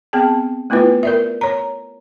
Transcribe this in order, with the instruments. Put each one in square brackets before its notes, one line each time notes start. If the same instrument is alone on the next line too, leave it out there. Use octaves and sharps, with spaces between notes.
[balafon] B3 C4 G#4 G5 A5
A3 B3 E4 F4 B4
A#4 D5 E5
C#5 A#5